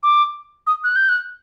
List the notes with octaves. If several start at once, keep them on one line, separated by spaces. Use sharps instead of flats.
D6
D#6
F#6
G6
F#6